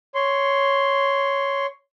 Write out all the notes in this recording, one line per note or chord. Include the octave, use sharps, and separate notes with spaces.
C#5 C6